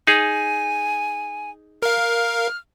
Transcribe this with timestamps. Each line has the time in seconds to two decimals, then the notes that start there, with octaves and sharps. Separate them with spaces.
0.07 D#4 G#4 G#5
1.82 A#4 F5 F6